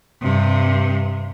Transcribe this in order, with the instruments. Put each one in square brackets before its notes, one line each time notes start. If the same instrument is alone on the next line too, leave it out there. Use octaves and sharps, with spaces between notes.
[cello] G2 C3